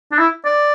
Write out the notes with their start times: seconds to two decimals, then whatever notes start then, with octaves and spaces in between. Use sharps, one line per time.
0.12 D4
0.18 E4
0.45 D5